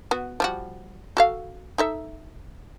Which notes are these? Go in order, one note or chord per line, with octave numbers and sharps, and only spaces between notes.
B3 F#4
F3 G3 F#4
F#4 A4 F5
D#4 A4 E5